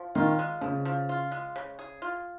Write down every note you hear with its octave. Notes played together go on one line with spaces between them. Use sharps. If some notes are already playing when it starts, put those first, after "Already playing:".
Already playing: F3
D#3 F4
G#3
C#3 F3
F3
F4
G#3
C#3
G#4
F4